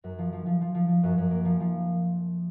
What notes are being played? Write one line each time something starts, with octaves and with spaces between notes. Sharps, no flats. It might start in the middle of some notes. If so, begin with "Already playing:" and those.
F#2
F3
F3
F3
F3
F3
F3
F#2
F#2
A#3
F3
F3